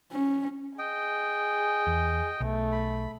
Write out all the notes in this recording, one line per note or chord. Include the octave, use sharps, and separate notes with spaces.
C#4
G#4 D#5 G5
E2
B1 A3
B5